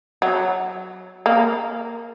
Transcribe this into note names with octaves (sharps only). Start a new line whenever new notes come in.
F#3
A#3